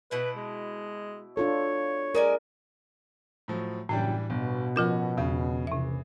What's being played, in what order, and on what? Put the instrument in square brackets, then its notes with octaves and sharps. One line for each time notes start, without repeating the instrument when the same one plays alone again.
[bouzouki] B2 E4 F#5 [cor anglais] B4
[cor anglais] G#3
[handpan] D4 F4 A4 [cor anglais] C#5
[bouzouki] G#3 D5 G#5 [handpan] A#4
[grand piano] A2 F3 F#3
[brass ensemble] F#1 F#2 G5 [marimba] A2 [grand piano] E3 G3 D4
[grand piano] G1 [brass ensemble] B2
[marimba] F3 F4 A#4 [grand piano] C#4 F#4
[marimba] E2 [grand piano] C#3
[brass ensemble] A#1 E3 [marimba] C3 E5